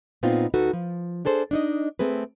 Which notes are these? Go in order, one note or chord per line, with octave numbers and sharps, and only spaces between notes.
A#2 B3 C4 D#4 F4
D2 D#4 F#4 A4 B4
F3
D4 G#4 A4 C5
D4 D#4 D#5
A3 C4 G#4 B4